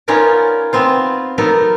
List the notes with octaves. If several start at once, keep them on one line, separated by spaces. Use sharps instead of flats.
B3 C#4 D#4 F4 A#4 D5
B3 C4 F4
F#3 B3 D#4 A4 A#4